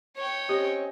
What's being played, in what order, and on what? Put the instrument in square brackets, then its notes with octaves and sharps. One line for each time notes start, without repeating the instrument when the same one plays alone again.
[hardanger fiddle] C#5 G5
[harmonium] C4 C#4 D#5 [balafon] G4